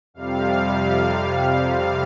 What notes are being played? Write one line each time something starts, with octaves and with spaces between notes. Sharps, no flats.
F2 C3 G3 F5
F5